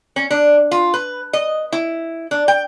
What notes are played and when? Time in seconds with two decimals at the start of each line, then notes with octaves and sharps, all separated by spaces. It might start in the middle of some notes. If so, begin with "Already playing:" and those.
0.16 C#4
0.31 D4
0.71 F4
0.94 B4
1.33 D#5
1.72 E4
2.31 D4
2.48 G5